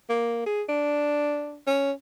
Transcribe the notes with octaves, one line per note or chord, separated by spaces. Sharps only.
A#3
G#4
D4
C#4